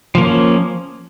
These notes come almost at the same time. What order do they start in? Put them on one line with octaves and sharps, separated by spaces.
F3 A#3 C#4